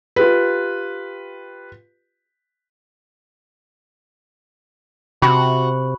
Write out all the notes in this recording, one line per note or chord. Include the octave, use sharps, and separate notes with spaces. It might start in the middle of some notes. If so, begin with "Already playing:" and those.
F4 G4 B4
C3 F#4 B5